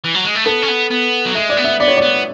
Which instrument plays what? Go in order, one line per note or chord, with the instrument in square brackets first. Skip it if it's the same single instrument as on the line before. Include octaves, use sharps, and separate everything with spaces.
[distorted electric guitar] E3
F#3
G#3
A3
[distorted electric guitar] B3 [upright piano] A4
[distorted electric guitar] C#4
B3
B3
F#3
[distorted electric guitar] G#3 [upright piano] E5
[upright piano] D5
[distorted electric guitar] B3
[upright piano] E5
[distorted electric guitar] B3 [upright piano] D5
[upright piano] C#5
D5
[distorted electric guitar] B3